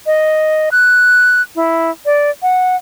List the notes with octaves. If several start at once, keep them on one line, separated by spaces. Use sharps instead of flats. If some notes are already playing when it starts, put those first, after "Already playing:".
D#5
F#6
E4
D5
F#5